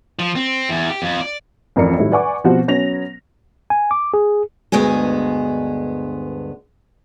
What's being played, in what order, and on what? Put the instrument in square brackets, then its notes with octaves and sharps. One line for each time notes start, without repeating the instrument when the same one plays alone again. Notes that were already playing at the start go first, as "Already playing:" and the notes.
[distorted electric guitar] F3
C4
E2
G4
F2
D5
[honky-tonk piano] A1 F2 A#4 D5 C#7
A2 D#3 F#3 G3
B4 D5 F#5 G#5 C#6 D6
B2 F3 C4 F#4 G4
F#3 B3 C#4 A#6 F7
[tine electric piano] G#5
D6
G#4
[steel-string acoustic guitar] D2 G2 G#3 B3 G#5